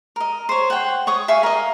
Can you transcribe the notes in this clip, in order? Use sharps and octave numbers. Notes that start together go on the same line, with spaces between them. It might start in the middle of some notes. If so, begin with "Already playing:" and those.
A#4 D#5
C5 C#5
F#5 G5
C#5 C#6 D#6
E5 F5 G#5 C#6
A#4 D#5